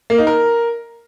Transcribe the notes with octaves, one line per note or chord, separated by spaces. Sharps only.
A#3
D#4
A#4